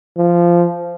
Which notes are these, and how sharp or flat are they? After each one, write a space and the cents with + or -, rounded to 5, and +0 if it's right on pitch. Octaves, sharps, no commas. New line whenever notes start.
F3 -15